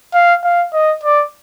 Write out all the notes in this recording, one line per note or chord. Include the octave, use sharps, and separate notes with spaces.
F5
F5
D#5
D5